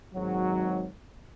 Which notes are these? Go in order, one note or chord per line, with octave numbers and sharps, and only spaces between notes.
G#1 G#2 F#3